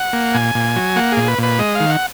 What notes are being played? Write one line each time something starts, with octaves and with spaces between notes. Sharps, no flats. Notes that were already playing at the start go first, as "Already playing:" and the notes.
Already playing: F#5
A#3
A#2 G#5
A#2
F#3
A#3 F#5
G#4
A#2
B4
A#2 B4
G#3 D#5
F5
D#3
F#5